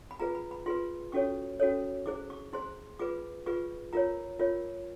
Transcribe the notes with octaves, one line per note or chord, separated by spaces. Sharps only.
B5
F4 G#4 B4 A#5
B5
B5
F4 G#4 B4 C6
C#4 F#4 A4 C#5 C#6
C#4 F#4 A4 C#5
E4 G#4 C5 D6
C#6
E4 G#4 C5 C6
F4 G#4 B4 D6
F4 G#4 B4 C#6
F4 A#4 C#5 A#5
F4 A#4 C#5